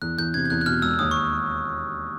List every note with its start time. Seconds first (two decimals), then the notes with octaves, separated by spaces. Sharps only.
0.02 E2 F#6
0.18 E2 G6
0.34 C3 G#6
0.45 G6
0.50 E2 F#6
0.61 F#6
0.66 B2 F6
0.82 E1 E6
0.99 D#2 D#6
1.11 C#6